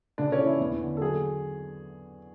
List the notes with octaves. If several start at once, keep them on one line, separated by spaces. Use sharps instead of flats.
C#3 D4
C#4
E3
E4
E2
D3
A4
F#3 G#4